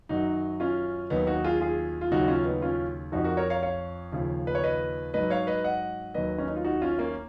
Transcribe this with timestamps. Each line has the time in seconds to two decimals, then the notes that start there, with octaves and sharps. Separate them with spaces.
0.09 F#2 D#3 F#3 D#4 F#4
0.60 C#4 F4
1.10 D#2 D#3 F#3 B3 D#4
1.27 D#4 F#4
1.44 F4 G#4
1.61 F4 G#4
2.01 F4
2.11 D#2 C#3 F#3 D#4 F#4
2.28 C#4 F4
2.45 B3 D#4
2.62 C#4 F4
3.12 F2 F3 D#4 F#4
3.24 F#4 A#4
3.37 A#4 C#5
3.50 C#5 F5
3.63 C#5 F5
4.13 D#2 C#3 F3
4.47 B4
4.55 C#5
4.64 B4 D#5
5.14 G#2 F#3 B4 D#5
5.30 C#5 F5
5.47 B4 D#5
5.64 D#5 F#5
6.14 D#2 D#3 F#3 B4 D#5
6.38 C#4
6.48 D#4
6.56 F4
6.64 D#4 F#4
6.82 C#4 F4
6.98 A#3 C#4